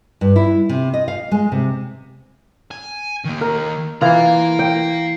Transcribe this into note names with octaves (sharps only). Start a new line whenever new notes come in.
G2
E4
C3
D#5
F5
G#3
C3
G#5
D#3 A#3
A#4
E3 F4 F5 A#5
G5